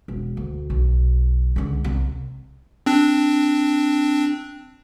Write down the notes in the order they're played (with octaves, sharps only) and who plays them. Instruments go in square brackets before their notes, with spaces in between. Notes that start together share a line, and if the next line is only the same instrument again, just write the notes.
[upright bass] E1
D2
B1
C#2 D3
C2
[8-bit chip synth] C4 D4